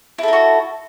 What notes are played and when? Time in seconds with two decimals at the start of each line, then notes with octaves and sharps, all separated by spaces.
0.18 E4
0.23 A4
0.28 A#4
0.33 F#4